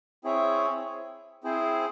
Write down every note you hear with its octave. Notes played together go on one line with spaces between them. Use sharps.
C4 E4 G#4 C#5 E5
C4 E4 G#4 C5